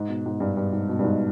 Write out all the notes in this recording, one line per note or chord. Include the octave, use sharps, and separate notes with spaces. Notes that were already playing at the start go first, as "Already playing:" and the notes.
Already playing: G#2
B2
G#2
G2
G2
G#2
B2
G2
G#2